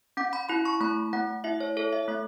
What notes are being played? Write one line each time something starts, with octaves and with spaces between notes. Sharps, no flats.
C#4 F#5
B5
E4 B5
C#6
A3 B5
A3 F#5
E4 E5
C#5
A4 C#5
E5
A3 E5